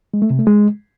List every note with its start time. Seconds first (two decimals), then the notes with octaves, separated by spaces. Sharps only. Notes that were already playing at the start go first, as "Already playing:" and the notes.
0.14 G#3
0.22 A3
0.30 C3
0.39 A3
0.47 G#3